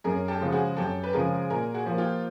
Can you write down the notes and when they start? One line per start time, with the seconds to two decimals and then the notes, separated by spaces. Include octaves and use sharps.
0.04 F#2 G#4 A#4
0.28 G4 A4
0.41 C#3 F3 G#3
0.52 F#4 G#4
0.77 F#2 G4 A4
1.04 B4
1.13 C#3 F3 G#3 G#4 A#4
1.50 A#2 G#4 A#4
1.74 F#4 G#4
1.86 F3 A#3
1.98 F4 G4